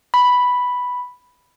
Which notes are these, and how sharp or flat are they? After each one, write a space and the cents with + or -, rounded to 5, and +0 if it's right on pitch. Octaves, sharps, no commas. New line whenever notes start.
B5 +0